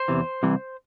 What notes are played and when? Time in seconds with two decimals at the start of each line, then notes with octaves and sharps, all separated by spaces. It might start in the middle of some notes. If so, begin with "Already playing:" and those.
Already playing: C5
0.08 E2 C3 E3
0.43 C2 C3 E3